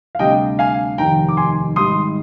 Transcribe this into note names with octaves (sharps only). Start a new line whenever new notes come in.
F5
D2 C3 G3 D4 D#5 G5
F5 G#5
F1 D#2 D#3 G5 A#5
D6
G#5 C6
G#1 G#2 G3 C6 D#6